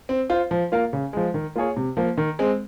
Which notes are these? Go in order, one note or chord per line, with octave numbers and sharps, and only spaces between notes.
C4
F4 C5
F3
A#3 F4 A#4 F5
C#3
F3 G#3
D#3
A#3 F4 G#4 C#5
C3
F3 A#3
D#3
G#3 C4